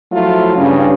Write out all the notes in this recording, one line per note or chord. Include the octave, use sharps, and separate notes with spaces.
F3 F#3 A3 E4 F4
G2 C#3